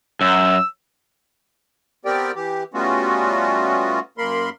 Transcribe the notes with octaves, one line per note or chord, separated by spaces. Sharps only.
F#2 E6
B3 C4 G4 A#4 D5 G5
E3 G4
G3 A3 B3 C#4 F4 F#4
F#2 A#3 A#4 B5 C6